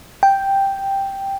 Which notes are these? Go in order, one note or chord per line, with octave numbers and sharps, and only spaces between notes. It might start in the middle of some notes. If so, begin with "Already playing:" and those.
G5